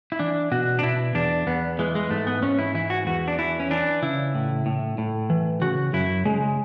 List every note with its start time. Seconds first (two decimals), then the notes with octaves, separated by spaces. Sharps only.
0.12 E4
0.19 E3 D4
0.51 B2 F#4
0.79 D4
0.83 B2 E4
1.15 E2 D4
1.47 E2 B3
1.79 E3 G#3
1.95 G#3
2.11 G#2 A3
2.27 B3
2.42 G#2 C#4
2.59 E4
2.74 E3 E4
2.90 F#4
3.07 E2 F#4
3.28 D4
3.38 E3 E4
3.60 C#4
3.71 E3 D4
4.02 C#3 E4
4.35 A2
4.66 A2
4.98 A2
5.30 E3
5.62 C#3 F#4
5.93 F#2 E4
6.25 C#3 G#3